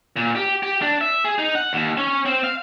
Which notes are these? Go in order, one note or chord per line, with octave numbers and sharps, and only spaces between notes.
A#2
G4
G4
D4
E5
G#4
D#4
F#5
D#2
C#4
C4
F5